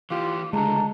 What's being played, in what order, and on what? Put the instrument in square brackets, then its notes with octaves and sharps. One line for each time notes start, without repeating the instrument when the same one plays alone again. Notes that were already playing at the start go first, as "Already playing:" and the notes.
[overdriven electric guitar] E3 G4 [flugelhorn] F4 [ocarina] D6
[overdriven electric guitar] C#2 D3 [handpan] G#3 [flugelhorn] A5 [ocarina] A#5